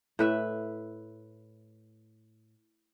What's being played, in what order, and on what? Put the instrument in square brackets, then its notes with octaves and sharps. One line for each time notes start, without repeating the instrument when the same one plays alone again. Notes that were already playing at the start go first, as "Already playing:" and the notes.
[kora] A2 B4 E5